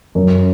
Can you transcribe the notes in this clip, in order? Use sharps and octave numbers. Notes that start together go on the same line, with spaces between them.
F#2